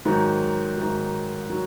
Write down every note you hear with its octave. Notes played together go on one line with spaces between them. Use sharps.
G#2 D#3 F#3
G#2 D#3 F#3
D#3 F#3